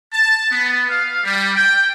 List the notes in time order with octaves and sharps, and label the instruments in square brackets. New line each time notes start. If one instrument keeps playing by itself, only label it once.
[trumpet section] A5
B3
F5
G3
G5